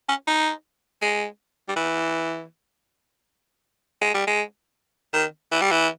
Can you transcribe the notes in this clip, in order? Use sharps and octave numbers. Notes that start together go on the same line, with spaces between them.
C#4
D#4
G#3
G3
E3
G#3
G3
G#3
D#3
E3
G3
E3